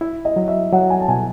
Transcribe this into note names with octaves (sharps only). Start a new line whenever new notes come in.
E4 E5
D#5
F#3
E5
F#3 F#5
G#5
A5
B2 G#5